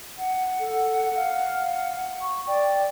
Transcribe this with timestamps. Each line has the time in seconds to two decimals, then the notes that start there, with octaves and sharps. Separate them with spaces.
0.18 F#5
0.60 A4
1.16 F5
2.22 C#6
2.47 D5 G5